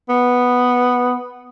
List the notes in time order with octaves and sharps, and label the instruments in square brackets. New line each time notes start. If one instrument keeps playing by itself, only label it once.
[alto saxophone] B3